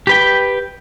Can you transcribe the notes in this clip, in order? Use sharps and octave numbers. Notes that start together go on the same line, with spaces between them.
G4 B4 G5